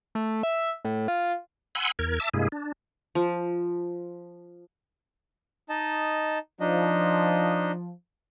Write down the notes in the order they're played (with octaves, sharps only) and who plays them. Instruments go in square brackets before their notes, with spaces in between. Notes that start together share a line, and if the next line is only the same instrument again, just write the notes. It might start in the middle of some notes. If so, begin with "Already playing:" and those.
[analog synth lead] A3
E5
A2
F4
[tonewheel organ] F#5 G#5 B5 C6 E6
E2 A#4 G#6
E5 A5 D6 E6
G2 C3 G#3 A#3 E4 G#4
D4
[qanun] F3
[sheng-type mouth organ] D#4 D#5 A5
[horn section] F3 [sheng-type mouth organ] D4 D#4 D#5